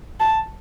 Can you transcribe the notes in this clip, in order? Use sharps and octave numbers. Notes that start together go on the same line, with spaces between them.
A5